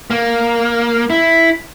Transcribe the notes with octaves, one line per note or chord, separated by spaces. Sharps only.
A#3
E4